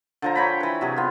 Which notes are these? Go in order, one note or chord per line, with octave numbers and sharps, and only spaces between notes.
D3 F3 A#5
C#5 G5 A#5 B5
E3 B4
C3 F#3 G#4
B3 F4